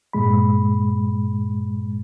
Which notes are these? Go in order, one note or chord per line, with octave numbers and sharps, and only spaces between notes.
G2 A#2 G#3 B5